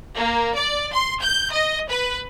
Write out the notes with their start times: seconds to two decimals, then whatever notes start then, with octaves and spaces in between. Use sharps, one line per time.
0.16 A#3
0.56 D5
0.93 C6
1.21 G6
1.52 D#5
1.89 B4